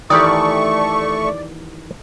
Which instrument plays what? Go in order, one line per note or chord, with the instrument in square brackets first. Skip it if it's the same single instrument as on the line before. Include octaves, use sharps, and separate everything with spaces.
[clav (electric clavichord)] D#3 E3 G4 [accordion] A3 C#6 [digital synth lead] D5 [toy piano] D#6